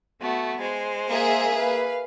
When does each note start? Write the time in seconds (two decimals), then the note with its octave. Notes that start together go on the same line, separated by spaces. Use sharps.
0.21 A3 B3 F#4
0.60 G#3 C5
1.07 A#3 G#4 E5
1.54 B4 F5